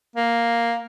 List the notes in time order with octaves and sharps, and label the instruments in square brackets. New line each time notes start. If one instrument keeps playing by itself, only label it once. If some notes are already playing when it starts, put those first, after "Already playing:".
[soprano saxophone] A#3